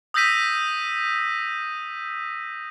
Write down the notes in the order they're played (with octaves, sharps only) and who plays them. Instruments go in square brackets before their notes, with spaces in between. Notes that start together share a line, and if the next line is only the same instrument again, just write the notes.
[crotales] D#6 E6 G6 A#6 B6 D#7